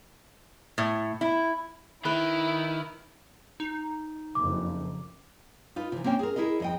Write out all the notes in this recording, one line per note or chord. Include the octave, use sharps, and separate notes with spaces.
A2
E4
D#3 E4 B4 E5
D#4
F#1 F2 D6
D#4 F4 B4
C3 E3
A#3 C4 C#4 G5
G#4 A#4
E4 G#4 A#4 D#5
F2 D#5 G5